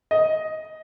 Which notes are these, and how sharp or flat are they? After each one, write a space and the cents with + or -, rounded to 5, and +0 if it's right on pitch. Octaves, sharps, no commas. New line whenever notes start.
D#5 +10